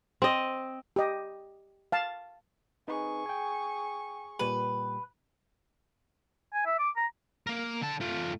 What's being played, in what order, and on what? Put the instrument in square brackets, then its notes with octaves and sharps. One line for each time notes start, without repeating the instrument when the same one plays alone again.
[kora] C4 D#5
[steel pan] G4 D#5
F5 A5
[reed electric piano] C4 D#4 B4 [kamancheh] G#4 C#6
[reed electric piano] G5 G#5
[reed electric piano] A#2 G3 G4 [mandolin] B4
[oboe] G#5
E5
D6
A#5
[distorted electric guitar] A#3 A#4
D3 A5
A3 F4